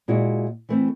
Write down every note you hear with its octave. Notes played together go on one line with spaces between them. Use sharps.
A#2 G#3 E4 F#4
E3 A3 C4